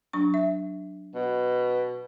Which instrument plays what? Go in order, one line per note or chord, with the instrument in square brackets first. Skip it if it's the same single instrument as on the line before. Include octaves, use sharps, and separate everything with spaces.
[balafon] F#3 D4 C#6
E5
[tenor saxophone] B2